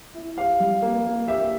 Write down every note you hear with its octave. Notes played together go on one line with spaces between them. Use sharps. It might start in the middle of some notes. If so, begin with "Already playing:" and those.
E4
G4 F5
G3
A#3
A#3
G4 E5